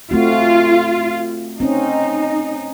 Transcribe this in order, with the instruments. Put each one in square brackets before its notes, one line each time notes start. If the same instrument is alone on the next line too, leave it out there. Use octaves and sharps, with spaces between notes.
[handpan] A3 C4 F#4 [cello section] F4
[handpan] C4 C#4 [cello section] D#4